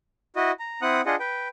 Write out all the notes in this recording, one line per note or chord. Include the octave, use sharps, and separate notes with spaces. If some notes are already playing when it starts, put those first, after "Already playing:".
E4 F#4 D#5
A#5
C4 E4 F#5 D#6 F#6
D4 F4 G#4 D#5 F#5
B4 G5